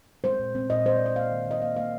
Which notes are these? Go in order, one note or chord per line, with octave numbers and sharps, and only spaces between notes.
G#3 C5
A#2
C4
A#2 D#5
G#3 C5
A#2 D5
D#5
A#3 F5
D#3
D#3 D#5
A#3 F5
A#3 F5